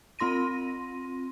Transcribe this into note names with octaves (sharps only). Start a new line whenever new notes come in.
C4 F4 C6 A#6 D#7